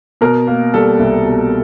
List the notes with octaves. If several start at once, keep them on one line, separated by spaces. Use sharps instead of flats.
B2 A#4
A#3
G3 A4
C2
B2